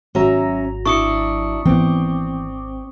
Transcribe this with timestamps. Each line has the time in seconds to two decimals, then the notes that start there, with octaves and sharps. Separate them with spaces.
0.15 G#1 F#3 C#4 E5 A#5
0.86 D4 E4 C#6 D#6 C#7
1.65 G#1 E3 B3 C4 D6